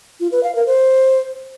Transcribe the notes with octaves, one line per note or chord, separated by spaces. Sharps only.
F4
B4
F5
A#4
C5